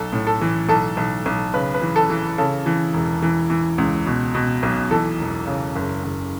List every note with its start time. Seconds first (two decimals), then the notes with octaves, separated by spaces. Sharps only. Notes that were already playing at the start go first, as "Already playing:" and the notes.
Already playing: B1 A4
0.13 A2
0.27 A4
0.41 E3
0.69 B1 A4
0.97 B1
1.26 B1
1.54 C#3 B4
1.74 B4
1.82 E3
1.96 A4
2.10 E3
2.38 C#3 A4
2.66 E3
2.93 E1
3.22 E3
3.50 E3
3.78 C#2
4.06 B2
4.35 B2
4.63 B1
4.91 E3 A4
5.19 E1
5.47 C#3
5.75 F#1
6.04 F#1